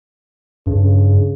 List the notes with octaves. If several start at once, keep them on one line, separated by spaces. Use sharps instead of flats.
G2 C#3